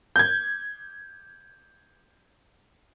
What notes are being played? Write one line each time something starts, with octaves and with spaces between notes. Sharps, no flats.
G6 G#6